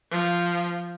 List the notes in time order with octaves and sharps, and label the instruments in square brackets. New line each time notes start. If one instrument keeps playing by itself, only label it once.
[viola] F3